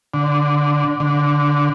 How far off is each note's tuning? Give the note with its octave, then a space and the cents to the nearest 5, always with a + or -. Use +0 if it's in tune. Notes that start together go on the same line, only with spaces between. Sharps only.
D3 -5
D3 -10